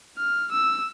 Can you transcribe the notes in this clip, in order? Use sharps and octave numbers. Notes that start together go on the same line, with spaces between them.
F6
E6